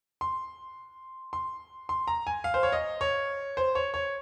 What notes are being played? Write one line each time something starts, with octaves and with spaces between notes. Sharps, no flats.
C6
C6
C6
A#5
G#5
F5
C5
C#5
D#5
C#5
C5
C#5
C#5